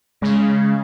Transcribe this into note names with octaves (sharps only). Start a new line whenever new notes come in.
C#3 G#3